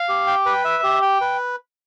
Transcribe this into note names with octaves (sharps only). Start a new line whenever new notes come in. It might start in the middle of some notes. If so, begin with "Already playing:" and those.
Already playing: F5
G4
G5
B4
E5
G4
G5
B4